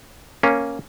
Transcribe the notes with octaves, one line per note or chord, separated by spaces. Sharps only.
A#3 C#4